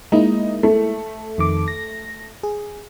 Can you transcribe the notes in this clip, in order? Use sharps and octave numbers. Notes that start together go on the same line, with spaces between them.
G#3 A#3 D#4 E4
A3
F2 D#3 D6
A#6
G#4